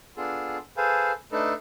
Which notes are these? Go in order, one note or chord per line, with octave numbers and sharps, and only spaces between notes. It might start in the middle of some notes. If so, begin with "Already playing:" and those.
B3 D4 F4 G#4 A4
G#4 A4 B4 C5 F5 G#5
A3 D4 D#4 A4 B4